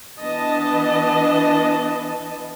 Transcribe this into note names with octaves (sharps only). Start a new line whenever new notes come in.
E3 B3 D4 D#5 A5